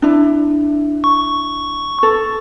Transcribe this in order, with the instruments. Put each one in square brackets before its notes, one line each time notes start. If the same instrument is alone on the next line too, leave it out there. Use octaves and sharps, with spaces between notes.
[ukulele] D4 E4
[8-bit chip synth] C#6
[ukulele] A4